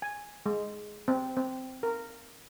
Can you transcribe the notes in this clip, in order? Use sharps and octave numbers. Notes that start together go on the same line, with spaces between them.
G#5
G#3
C4
C4
A#4